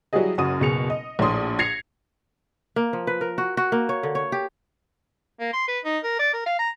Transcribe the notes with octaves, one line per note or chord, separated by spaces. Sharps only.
F#3 G3 E4 F#4 G#4 D#5
F#1 F#2 F#4 D#6 D#7
F#1 B2 G#4 C#7 F7
D#5
A#1 A2 C#5 C6 D#6
G#6 A#6 C7 C#7 F7
A#3
F3
B4
A#4
F#4
F#4
A#3
C#5
D3
C#5
G4
A#3
C6
B4
D#4
A#4
D5
A#4
F5
A#5